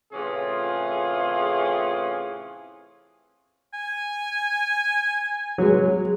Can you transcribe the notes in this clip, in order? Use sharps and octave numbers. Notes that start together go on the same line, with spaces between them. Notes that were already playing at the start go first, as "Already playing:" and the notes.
A2 C3 E3 C#4 F4 G#4
G#5
F#3 G#3